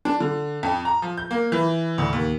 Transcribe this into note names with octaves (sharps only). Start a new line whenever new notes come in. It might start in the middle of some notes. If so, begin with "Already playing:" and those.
D4
D3
F2
A#5
F3
G6
A#3
E3
D2
D#2